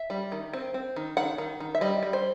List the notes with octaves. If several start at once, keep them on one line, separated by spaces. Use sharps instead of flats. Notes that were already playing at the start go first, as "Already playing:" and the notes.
Already playing: E5
G3
D#3
C4
C4
D#3
D#3 F#5
D#3
D#3
E5
G3 D#5
G3
C5